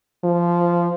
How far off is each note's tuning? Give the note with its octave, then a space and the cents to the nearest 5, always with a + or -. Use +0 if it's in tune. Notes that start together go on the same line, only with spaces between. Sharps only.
F3 -15